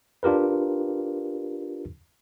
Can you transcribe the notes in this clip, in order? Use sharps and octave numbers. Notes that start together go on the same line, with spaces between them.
D4 F4 G4 A#4 B4